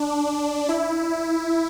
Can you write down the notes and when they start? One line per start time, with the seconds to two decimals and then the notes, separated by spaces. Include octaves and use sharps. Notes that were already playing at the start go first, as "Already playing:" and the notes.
Already playing: D4
0.69 E4